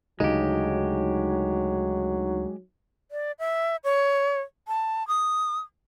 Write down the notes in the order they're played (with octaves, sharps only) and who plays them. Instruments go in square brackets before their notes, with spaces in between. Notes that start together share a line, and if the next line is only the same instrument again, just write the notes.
[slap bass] D2 C#3 [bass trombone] F#3 [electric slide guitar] G#3 G4 [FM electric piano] D#4
[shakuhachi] D5
E5
C#5
A5
D#6